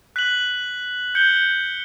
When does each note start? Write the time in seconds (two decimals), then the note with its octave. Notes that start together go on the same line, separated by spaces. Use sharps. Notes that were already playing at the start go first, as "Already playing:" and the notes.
0.16 F#6 B6 F#7
1.15 G6 C#7 G7